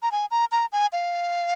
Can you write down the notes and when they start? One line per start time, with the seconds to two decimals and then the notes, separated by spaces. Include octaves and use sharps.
0.02 A#5
0.12 G#5
0.31 A#5
0.52 A#5
0.72 G#5
0.93 F5